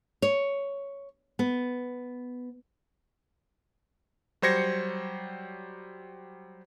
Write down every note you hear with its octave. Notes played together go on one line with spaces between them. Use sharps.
C#5
B3
F#3 G3 C5 G#6 A#6 C#7